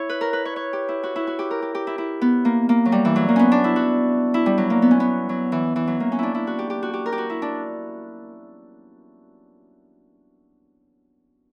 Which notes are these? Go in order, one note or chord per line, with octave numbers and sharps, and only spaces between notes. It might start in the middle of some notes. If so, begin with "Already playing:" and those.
Already playing: E4 C#5
B4
A#4
B4
C#5
C#5
G4
E4
F#4
E4
F#4
G4
A#4
G4
G4
E4
E4
B3
A#3
A#3
F#3
G3
E3
F#3
A#3
B3 C#4
D4
E4
F#4
E4
G3
F#3
A#3
B3
C#4
B3
F#3
E3
E3
F#3
A#3
C#4
D4 E4
E4
F#4
G4
G4
F#4
G4
A#4
G4
F#4
E4
D4